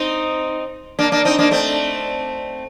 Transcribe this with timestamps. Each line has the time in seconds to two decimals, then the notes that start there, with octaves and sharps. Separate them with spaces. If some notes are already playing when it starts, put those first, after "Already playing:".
Already playing: C4 D#4
0.99 A#3 D4
1.12 A#3 D4
1.25 C4 D#4
1.39 A#3 D4
1.51 A3 C4